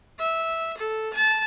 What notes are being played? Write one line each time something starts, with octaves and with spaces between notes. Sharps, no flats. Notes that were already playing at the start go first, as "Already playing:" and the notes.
E5
A4
A5